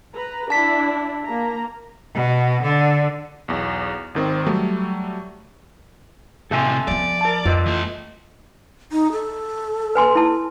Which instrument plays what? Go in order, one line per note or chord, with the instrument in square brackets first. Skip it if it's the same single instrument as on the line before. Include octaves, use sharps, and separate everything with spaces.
[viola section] B4 A#5
[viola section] D4 E4 [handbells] A5 B6
[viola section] A#3 A#5
[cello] B2
D3
[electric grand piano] B1 E2
G#1 D#3 C4
F#3 G3 A3
[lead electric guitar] A2 C3 [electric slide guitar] A4 E5 G#5
[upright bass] F3 B3 [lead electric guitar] D5
[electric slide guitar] A#4 A5
[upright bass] F2 [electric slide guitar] F4 B4 D#5
[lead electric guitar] E3 A3
[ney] D#4
A4
[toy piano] B4 G#5 C6
E4 A5